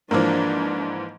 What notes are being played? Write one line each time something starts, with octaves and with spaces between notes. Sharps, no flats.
G#2 E3 F3 A#3 D4